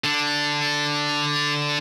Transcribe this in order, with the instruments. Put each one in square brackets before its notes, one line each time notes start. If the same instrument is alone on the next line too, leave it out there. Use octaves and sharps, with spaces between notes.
[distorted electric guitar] D3 D4